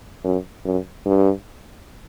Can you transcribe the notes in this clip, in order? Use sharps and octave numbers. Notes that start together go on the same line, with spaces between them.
F#2
F#2
G2